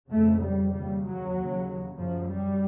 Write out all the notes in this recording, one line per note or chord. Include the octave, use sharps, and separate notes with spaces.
F2 C#3 A3
G3
D#2 C#3 G3
F#3
D#2 C#3
F#2 C#3 F3
G3